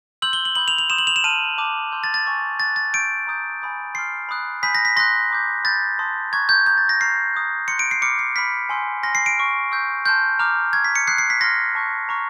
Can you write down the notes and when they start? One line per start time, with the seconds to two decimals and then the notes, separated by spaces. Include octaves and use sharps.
0.22 C6 E6 G6 F#7
0.33 G7
0.45 F#7
0.55 B5 D#6 G6 F#7
0.68 F7
0.78 F7
0.90 C6 D#6 G6 E7
0.98 F#7
1.07 F7
1.16 E7
1.24 A5 C6 F6 D#7
1.58 A5 D6 F#6
1.92 C6 E6 G6
2.04 A6
2.14 A6
2.25 G#5 C#6 E6
2.60 C#6 F#6 A6
2.76 A6
2.93 C#6 E6 G6 D7
3.27 A#5 D#6 G6
3.61 G#5 B5 D#6 G6
3.95 C6 F6 C7
4.29 B5 D#6 F#6
4.63 G#5 B5 D#6 G6 B6
4.75 A#6
4.85 B6
4.96 C6 D#6 F#6 A#6
5.30 A#5 D6 G6
5.64 B5 E6 G6 A6
5.99 A5 C6 D#6
6.33 A#5 C#6 F#6 G#6
6.49 G6
6.66 A#5 D#6 F#6 G6
6.78 A6
6.89 A#6
7.00 A#5 C#6 F6 C7
7.34 A#5 D#6 F#6
7.68 C6 D#6 F#6 C#7
7.79 D7
7.91 C7
8.02 B5 D6 F6 C#7
8.19 C7
8.36 B5 D6 F6 B6
8.69 G#5 C6 E6 G6
9.03 G#5 C6 F6 A#6
9.15 C7
9.26 D7
9.37 C#6 F6
9.71 C#6 E6 G6
10.06 A5 C6 F6 G6
10.39 A#5 D6 F6
10.73 C#6 E6 G6 G#6
10.84 B6
10.96 C#7
11.07 C6 D#6 F#6 C7
11.18 C7
11.30 B6
11.41 C6 F6 A#6
11.75 A5 C#6 F#6
12.09 A#5 C#6 F6